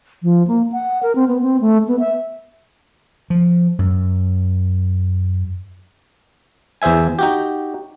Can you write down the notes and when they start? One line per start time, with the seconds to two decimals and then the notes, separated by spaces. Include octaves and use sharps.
0.23 F3
0.47 A#3
0.72 F#5
1.03 A#4
1.16 C4
1.28 B3
1.42 C4
1.61 A3
1.88 B3
1.99 E5
3.30 F3
3.79 F#2
6.82 E2 G#4 C5 E5 G#5
7.19 D#4 F#4 G4